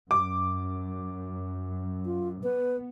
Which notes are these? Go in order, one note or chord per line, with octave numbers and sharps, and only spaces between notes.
F#2 D6
F4
B3 B4